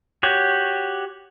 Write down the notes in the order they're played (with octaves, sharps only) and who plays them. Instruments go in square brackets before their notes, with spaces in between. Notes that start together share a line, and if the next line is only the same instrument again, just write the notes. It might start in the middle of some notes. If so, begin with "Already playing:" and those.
[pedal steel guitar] F#4 G4 C#5